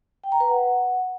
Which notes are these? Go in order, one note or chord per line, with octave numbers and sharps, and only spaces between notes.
G5
A#5
B4
F#5